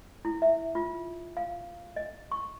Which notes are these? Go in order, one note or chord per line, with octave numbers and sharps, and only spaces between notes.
E4
E5
F4
F5
D#5
C#6